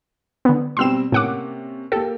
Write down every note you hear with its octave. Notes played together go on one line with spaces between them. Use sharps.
D3 B3
B2 G3 C4 C6 E6 E7
A2 C3 A#3 C#4 F#5 D6
A#3 G4 A4